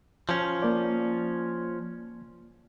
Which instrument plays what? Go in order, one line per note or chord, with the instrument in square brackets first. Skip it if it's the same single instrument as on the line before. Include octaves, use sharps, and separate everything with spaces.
[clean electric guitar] F3 C#4
[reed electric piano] A#3 D5